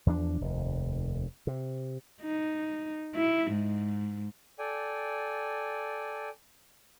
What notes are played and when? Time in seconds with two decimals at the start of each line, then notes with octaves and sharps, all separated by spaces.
0.06 E2 F3 A#3 D4
0.41 F1 D#2
1.47 C3
2.22 D#4
3.15 E4
3.51 G#2
4.59 A4 D5 G5 G#5